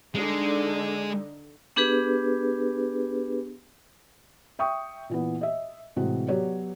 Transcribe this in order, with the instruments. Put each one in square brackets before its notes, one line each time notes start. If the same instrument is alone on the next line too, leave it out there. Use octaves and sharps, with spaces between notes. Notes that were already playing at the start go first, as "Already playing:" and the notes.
[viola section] D3 D#4 [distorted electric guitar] G#3
[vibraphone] B3 D4 G4 G#4 B4
[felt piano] E5 G5 C#6 D#6
A#2 E3 B3
D#5 E5
A2 C3 E3 G#3 F#4
F#3 B3 F#4 G4 C#5 D5